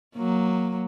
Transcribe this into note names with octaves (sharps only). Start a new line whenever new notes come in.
F#3 A#3